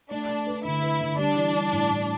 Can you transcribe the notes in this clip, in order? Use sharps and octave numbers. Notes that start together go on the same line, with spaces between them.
A3 D4
A3
B4
D3 E4
B4
D3
G3 D4
E3
G3
A2
A2